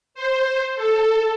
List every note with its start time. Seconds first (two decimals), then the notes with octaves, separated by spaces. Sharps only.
0.14 C5
0.76 A4